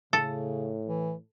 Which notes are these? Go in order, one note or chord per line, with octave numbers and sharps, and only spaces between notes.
A2 C#3 A4
E3